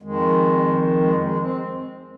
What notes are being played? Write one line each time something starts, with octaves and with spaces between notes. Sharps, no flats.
F2 D#3 G#3
G#3
G#3
C4